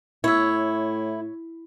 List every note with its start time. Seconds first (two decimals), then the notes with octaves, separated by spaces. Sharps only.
0.24 A2 E4 C#5 E5